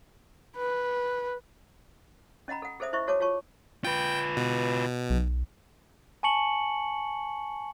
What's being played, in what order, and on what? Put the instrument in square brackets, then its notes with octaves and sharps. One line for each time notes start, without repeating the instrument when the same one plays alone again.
[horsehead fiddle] B4
[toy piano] C#4 D#5 F#5 A#5 B5
A4 F#5
G#4 A4 C5 E5 D#6
E4 C5 D#5 E5 C#6
F#4 A4 C#5 A5 D6
F4 G#4 C#5 A5 C#6
[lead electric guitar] F4 B4 [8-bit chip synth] G5
[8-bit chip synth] B2
[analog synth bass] B1
[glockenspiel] G#5 A5 C#6 C#7 F#7